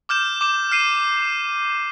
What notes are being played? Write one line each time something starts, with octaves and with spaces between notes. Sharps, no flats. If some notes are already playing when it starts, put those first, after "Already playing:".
D6 F6 G6 E7
D6 E7
F6 C7 D#7